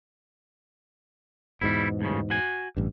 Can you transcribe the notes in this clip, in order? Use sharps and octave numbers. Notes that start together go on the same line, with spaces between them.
E2 G#2 B2 G3 E4
D2 G2 C#3
F#4 G#5
A1 G2